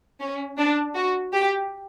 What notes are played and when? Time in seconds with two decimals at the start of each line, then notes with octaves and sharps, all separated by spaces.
0.20 C#4
0.57 D4
0.95 F#4
1.33 G4